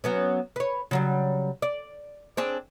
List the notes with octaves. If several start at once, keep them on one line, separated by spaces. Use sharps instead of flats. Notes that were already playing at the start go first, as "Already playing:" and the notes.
F#3 B3 C#4
B4 C#5
C#3 F#3 G3
D5
C4 D4 G#4